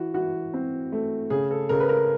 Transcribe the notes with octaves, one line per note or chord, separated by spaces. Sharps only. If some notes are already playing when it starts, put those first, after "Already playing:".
Already playing: E3 F#4
E3 F#4
C4
A3
C#3 G#4
A4
C#3 A#4
B4
A#4